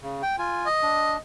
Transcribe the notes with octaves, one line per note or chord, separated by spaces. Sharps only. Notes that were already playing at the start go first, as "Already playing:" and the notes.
C#3
G5
F4 G#5
D#5
D4